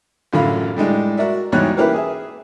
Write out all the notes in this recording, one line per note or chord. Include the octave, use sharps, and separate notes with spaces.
A1 F#2 D3 F4 F5 B5
A2 G3 G#3 D4
F#4 A#4 D5 E5
E2 G#2 B2 G3 C#5 F#6
A#3 C#4 E4 G4 A#4 B4
G#4 E5